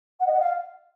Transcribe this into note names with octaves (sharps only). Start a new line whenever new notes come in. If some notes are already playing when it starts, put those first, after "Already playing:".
F#5
D#5
F#5
F5